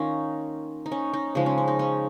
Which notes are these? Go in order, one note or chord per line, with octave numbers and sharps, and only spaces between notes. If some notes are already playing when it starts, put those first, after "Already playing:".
Already playing: D#3 A#3 C#4 D#4 F4
D#4
C#4
D#4
C#3 F3 G#3 D#4
C#4
C#4
D#4
C#4